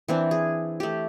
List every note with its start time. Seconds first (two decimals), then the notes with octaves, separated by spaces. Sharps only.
0.08 E3 C4 D4
0.31 G#4
0.80 A3 G4